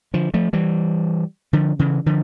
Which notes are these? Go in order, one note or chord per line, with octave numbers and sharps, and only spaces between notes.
D3 F3
F3 A3
E3 G3
D3 F3
C#3 E3
D3 F3